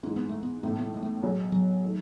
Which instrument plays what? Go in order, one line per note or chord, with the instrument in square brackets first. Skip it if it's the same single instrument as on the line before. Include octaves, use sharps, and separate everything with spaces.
[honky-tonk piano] G#2 E3 G#3 [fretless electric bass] C#4
[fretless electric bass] B3
A3
B3
[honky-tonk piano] B1 A2 E3 [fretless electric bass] A3
[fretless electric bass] B3
A3
G#3
A3
[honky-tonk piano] B2 F#3 C#4 G#4
[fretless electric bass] F#3
[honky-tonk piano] D#3 A3